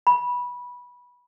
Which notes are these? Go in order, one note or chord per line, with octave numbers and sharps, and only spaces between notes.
B5